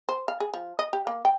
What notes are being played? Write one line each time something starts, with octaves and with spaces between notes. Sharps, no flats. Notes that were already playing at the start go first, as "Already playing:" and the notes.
C5
F5
G#4
F3
D#5
G4
A#3
G5